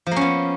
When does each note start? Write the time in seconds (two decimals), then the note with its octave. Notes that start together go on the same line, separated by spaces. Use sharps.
0.06 F3
0.11 A#3
0.16 C#4
0.21 B3